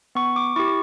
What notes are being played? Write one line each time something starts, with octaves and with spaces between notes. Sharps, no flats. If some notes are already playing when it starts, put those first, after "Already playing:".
B3 C#6
D6
E4 G4 C#6